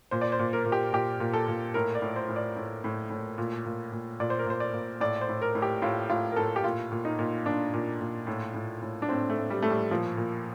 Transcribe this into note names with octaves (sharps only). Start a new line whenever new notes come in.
A#2 C5
D5
C5
A#2
A#4
A#2
G4
A#2 G4
A#2
A4
A#2
A2 A#4
D5
A2
C5
A2
D5
A2
A2
A2
A#2
A#2
A#2
A#2 D5
C5
A#4
A#2 C5
D5
A#2
A2 D5
C5
A2
A#4
A2
G4
A2 F4
A2 F4
A#4
A2 A4
G4
A#2 F4
A#2
D#4
A#2
A#2 D4
A#2
A#2
A2
A2
A2
D4
A2 C4
A3
A2
G3
A2 A3
G3
A#2 F3
A#2